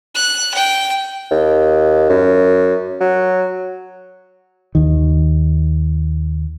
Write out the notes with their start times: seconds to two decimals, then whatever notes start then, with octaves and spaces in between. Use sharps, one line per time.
0.15 F#6
0.54 G5
1.31 D#2
2.10 F#2
3.01 F#3
4.75 D#2 D#3